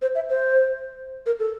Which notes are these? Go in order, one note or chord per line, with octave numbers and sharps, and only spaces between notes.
C5
E5
C5
A#4
A4